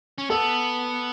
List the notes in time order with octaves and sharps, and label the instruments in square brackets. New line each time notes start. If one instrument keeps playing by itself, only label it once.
[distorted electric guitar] C#4
[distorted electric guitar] B3 [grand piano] A4